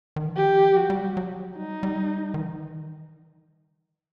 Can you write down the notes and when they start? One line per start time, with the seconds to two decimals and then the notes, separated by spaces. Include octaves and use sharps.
0.16 D#3
0.26 E3
0.36 F3 G4
0.71 F#3
0.77 F3 F#4
0.90 G3
1.17 F#3
1.58 G3 D#4
1.83 G3
2.34 D#3
2.38 E3
2.52 D#3